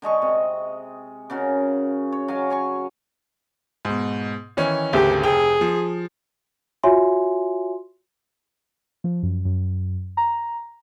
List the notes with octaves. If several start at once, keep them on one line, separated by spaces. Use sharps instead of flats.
D3 G#3 D#5 C#6
C3
C#3 C#4 F#4 A#4
C#5
F#3 F5 G#5
C#5 G#5 C#6
G#2 B2
D#3 E3 C#4
G#1 D2 C#3 G4
F1 G#4 G5
F3
F4 F#4 C#5 E5 G#5 C6
F3
F#2
F#2
A#5